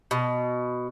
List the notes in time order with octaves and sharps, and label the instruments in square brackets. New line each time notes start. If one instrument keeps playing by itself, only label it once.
[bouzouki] B2